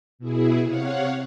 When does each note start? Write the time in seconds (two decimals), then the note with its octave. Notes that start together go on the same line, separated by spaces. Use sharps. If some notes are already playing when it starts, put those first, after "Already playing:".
0.19 B2 E4 G#4
0.62 C3 C#5 F5 F#5